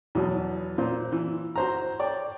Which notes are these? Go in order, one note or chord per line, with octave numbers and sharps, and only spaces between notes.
E2 B2 F#3
A#2 C5
E3
F#4 C5 A#5
C#5 D5 G5